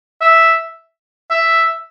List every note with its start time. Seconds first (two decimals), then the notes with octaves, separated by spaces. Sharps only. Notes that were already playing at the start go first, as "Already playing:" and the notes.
0.21 E5
1.30 E5